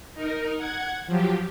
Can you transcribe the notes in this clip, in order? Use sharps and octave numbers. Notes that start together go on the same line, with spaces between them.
D#4 A#4
F#5 G#6
F3 F#3 G4